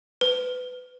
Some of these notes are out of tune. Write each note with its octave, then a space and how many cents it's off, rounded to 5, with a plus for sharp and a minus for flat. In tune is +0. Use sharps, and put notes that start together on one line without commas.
B4 +25